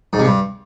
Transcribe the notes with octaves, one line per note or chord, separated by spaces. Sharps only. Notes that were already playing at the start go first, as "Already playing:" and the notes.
G#2
C3
G2